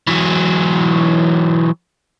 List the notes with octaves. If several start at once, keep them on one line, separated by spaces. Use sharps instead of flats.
E3 F#3